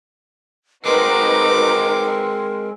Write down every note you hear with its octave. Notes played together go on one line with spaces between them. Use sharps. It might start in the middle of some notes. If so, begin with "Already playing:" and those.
G#3 C4 D#4 F#4 A#4 B4 D6